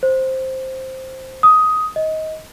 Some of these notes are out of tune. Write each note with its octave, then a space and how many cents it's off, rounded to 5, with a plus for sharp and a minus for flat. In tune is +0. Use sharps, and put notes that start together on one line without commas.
C5 +5
D#6 +10
D#5 +20